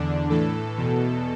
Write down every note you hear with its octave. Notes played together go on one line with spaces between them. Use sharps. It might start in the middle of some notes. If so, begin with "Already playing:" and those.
Already playing: E2 D3 D4
A2 E3 A4
E2 B2